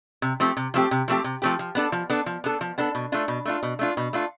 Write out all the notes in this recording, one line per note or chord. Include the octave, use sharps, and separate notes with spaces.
C3
F3 A3 C4 G4
C3
F3 A3 C4 G4
C3
F3 A3 C4 G4
C3
F3 A3 C4 G4
F3
B3 D4 A4
F3
B3 D4 A4
F3
B3 D4 A4
F3
B3 D4 A4
B2
A3 D4 F4
B2
A3 D4 F4
B2
A3 D4 F4
B2
A3 D4 F4